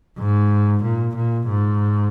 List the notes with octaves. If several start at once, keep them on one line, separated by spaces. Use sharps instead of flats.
G#2
A#2
A#2
G#2